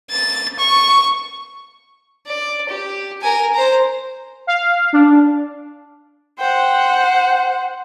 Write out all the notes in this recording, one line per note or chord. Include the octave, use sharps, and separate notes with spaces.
A6
C#6
D5
G4
A#4 G#5
C5 A#5
F5
D4
C5 F#5 G5